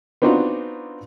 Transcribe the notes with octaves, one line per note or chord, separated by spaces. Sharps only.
B3 C4 D4 D#4 F4 F#4